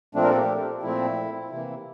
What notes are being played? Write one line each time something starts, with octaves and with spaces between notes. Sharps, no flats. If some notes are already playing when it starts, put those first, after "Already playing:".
A#2 F3 A3 C4 D4
A#4
A4
G4
A#2 F3 A3 C4 E4
C3 E3 A#3 E4